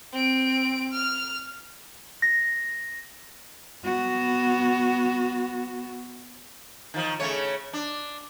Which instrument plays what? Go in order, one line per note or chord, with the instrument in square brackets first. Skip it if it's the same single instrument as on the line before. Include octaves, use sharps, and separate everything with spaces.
[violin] C4 D7
F6
[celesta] A#6
[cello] B3 F#4
[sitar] D#3 F3
C#3 A3 C#5
D4